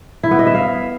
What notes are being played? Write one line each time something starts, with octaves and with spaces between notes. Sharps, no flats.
E4
B3
D#5
E5
F5